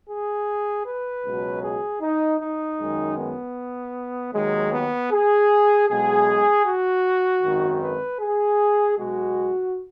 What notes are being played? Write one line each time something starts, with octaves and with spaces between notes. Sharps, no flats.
G#4
B4
C#2 B2 F#3
G#4
D#4
D#4
F#2 D#3 G#3
B3
D#2 D#3 F#3 G#3
B3
G#4
B1 B2 G#3 G#4
F#4
G#1 F#2 D#3
B4
G#4
B1 B2 G#3 F#4